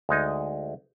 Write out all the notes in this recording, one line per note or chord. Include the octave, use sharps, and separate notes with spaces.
D2 G#3 D#4 D#5